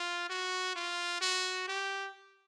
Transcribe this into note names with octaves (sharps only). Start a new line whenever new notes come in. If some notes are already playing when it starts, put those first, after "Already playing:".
Already playing: F4
F#4
F4
F#4
G4